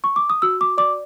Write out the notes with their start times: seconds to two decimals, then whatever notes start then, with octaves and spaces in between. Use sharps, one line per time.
0.04 C#6
0.16 D6
0.30 D#6
0.42 F#4 E6
0.61 D6
0.78 D5 D6